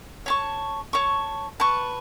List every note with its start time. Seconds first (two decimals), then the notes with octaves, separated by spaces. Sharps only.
0.26 C#5 A5 C#6
0.93 C#5 A5 C#6
1.60 B4 A5 C#6